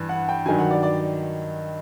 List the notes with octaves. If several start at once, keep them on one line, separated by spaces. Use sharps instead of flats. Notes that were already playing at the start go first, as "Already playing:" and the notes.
Already playing: G2 E3
F#5
G5
G2 D#3 F#3 G#5
F#5
D5
D5